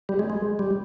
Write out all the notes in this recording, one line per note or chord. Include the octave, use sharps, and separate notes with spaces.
G3
G#3
G#3
G3